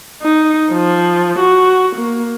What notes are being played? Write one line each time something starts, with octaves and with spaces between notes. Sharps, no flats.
D#4
F3
F#4
A#3